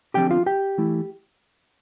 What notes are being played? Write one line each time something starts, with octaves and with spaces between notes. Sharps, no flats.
D3 F3 C4 G4 G5
F4 F5
G4 G5
E3 A3 E4